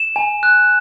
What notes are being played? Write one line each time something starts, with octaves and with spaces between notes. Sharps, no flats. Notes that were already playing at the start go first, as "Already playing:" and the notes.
Already playing: E7
G#5
F#6